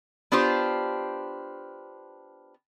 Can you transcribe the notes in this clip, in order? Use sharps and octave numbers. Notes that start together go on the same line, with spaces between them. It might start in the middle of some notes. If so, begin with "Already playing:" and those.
B3 D4 F4 G4 C5